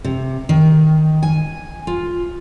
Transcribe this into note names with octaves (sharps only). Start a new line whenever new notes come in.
C3
D#3
G#5
F4